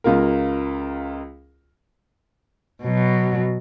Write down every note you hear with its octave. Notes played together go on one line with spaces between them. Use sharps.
C#2 F4 A#4
B2 F#3